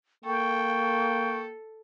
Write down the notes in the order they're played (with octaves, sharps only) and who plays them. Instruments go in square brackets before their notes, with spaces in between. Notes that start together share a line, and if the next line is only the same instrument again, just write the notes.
[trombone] A#3 [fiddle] A4 [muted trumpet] G5 [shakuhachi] C#6